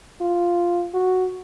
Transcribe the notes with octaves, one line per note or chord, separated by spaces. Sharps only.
F4
F#4